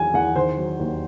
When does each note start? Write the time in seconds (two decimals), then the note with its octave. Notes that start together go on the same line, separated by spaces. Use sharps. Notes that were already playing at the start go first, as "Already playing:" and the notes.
Already playing: E2 D#3 F#3 G#5
0.14 E2 F#5
0.35 D#3 C5
0.57 F#3
0.80 D#2